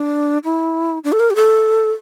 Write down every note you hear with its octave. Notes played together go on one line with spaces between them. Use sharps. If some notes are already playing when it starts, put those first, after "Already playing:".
Already playing: D4
E4
D4
A4
A#4
G4
A4